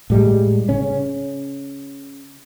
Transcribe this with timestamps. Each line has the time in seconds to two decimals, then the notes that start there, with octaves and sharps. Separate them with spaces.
0.10 A2 G3 G#3
0.69 C#3 C#4